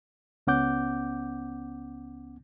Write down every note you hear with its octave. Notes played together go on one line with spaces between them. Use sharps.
C#2 B3 C#4 F#5 D6 G6